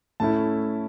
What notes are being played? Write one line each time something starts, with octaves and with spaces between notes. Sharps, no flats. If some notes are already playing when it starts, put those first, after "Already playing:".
A2 A3 C#4 E4 A5